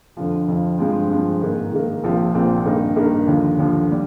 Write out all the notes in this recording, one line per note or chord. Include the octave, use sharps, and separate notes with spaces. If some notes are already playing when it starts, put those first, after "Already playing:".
F2 D3 F3
F2 D3 F3
G2 F3 G#3 C4
G2 F3 G#3 C4
G#2 D#3 A#3
G#2 D#3 A#3
A#1 A#2 F3 C4
A#1 A#2 F3 C4
G2 D#3 A#3 D#4 A#4
G2 D#3 A#3 D#4 A#4
D#2 D3 F3
D#2 D3 F3
G3